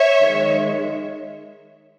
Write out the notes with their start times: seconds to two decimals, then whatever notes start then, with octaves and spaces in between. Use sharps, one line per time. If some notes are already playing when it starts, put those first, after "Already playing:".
Already playing: C#5 E5
0.19 D#3 G#3